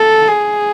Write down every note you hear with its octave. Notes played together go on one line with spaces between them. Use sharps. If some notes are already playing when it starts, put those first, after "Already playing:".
Already playing: A4
G#4